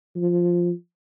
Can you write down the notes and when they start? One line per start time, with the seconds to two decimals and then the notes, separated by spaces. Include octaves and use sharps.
0.16 F3